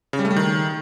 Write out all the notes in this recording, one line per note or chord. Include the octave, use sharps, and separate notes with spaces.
C#3
G3
A3
G3
D#3